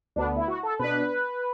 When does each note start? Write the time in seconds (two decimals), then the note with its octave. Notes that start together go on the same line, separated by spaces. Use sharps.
0.16 D2 D3 B3 D4
0.36 E4
0.48 F#4
0.63 A4
0.79 B2 B3 D4 B4